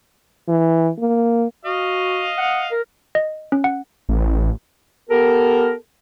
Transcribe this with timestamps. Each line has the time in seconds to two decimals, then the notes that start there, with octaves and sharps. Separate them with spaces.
0.48 E3
0.99 A#3
1.65 F#4 D#5 F5
2.38 F#5
2.71 A#4
3.15 D#5
3.52 C#4
3.64 F#5
4.09 A1
5.10 B3 G4 A4 A#4